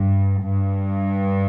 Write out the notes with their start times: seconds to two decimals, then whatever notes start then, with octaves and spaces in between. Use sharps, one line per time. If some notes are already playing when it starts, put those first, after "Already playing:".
Already playing: G2
0.42 G2